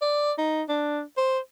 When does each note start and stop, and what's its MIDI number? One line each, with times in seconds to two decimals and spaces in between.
0.02 0.32 74
0.38 0.63 63
0.69 1.01 62
1.17 1.39 72